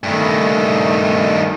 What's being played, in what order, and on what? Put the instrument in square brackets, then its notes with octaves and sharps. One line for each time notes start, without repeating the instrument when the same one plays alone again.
[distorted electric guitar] G2 D#3 [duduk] A3